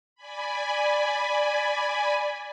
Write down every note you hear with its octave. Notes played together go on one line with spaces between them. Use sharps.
D5 G#5 B5